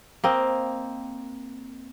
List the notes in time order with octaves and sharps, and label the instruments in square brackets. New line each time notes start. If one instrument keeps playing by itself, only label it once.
[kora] A#3 C4 D#5